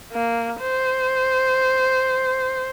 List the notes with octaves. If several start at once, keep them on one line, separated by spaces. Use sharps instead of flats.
A#3
C5